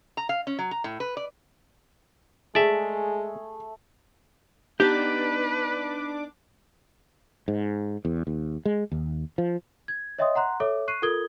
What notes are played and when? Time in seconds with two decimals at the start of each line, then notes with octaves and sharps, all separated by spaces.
0.17 A#5
0.29 F5
0.47 C#4
0.59 F#3
0.71 A#5
0.84 A2
1.00 B4
1.17 D5
2.55 G#3 A3 G#4 D5 E5
4.80 B3 D4 D#4 G4 B4 D6
7.48 G#2
8.05 E2
8.27 D#2
8.65 G#3
8.92 D#2
9.38 F3
9.88 G#6
10.19 C#5 D#5 E5 G5 C6 D#6
10.35 F#5 A#5 C6 F#6
10.60 A4 C#5 E5 D6
10.88 C#6 F#6 C7 D#7
11.02 F4 A4 A#4 D#6 G#6 G7